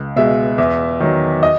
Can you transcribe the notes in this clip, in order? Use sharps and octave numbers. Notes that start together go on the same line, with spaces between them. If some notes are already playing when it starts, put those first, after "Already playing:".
Already playing: C#2
B2 G#3 E5
E2 E5
D#3 F#3
D#5